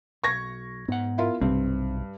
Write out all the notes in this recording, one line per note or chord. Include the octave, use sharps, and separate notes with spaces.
B1 C#6 G#6 A#6
G#2 B3 F#5
E4 F4 A#4
B1 G2 C3 C4